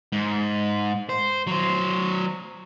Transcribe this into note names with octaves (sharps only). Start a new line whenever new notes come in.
G#2
C5
F#3 C5